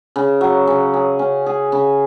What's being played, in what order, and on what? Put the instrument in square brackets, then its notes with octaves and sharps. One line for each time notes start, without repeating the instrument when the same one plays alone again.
[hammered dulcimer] C#3
F#3
C#3
G#4
C#4
G#4
C#3